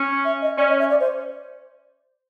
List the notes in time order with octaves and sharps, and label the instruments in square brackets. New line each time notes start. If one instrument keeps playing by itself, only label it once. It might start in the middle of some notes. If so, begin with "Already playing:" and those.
Already playing: [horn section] C#4
[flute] E5
D#5
[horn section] C#4 [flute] D5
[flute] D#5
E5
D5
C5